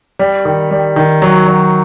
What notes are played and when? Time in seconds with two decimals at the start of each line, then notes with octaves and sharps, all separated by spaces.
0.19 G3
0.45 D#3
0.71 G3
0.96 D#3
1.22 F#3
1.47 F#3